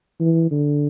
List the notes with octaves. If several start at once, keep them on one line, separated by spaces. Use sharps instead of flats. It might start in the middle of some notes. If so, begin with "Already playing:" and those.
E3
D3